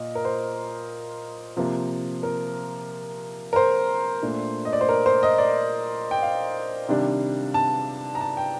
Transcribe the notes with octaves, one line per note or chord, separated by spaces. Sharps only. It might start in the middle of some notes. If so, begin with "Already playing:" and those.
Already playing: A#2 D#5
A#4
C5
C3 F3 A#3
A#4
A#4
C5
A#2 A3 D4
D#5
D5
C5
A#4
C5
D#5
D5
G5
F5
C3 D#3 G3 D4
A5
A#5
A5
G5